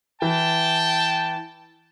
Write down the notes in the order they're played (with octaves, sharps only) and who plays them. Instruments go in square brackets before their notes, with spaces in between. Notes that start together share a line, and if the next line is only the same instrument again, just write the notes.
[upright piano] E3 [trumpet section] G5 A5